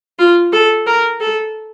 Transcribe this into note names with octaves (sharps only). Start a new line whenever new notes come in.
F4
A4
A#4
A4